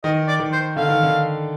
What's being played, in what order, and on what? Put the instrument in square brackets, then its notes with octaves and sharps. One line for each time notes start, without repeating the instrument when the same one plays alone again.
[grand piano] D#3 [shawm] D#5
[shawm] D5
[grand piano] D#3
[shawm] C5
[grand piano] D3 [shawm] F5
[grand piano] D#3
D3